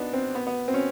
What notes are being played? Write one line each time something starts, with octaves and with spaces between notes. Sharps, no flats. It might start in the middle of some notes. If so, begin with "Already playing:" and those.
Already playing: B3 D4 D#4
C4
B3
B3
C4
C#4